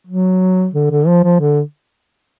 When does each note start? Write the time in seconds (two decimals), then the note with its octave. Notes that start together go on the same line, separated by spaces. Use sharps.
0.07 F#3
0.74 D3
0.91 D3
1.07 F3
1.24 F3
1.40 D3